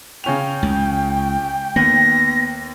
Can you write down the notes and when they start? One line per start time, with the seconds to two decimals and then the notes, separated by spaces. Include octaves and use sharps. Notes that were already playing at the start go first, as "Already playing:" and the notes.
0.24 C#3 C#4 G5 F7
0.63 C#2
1.76 D#2 B3 A#6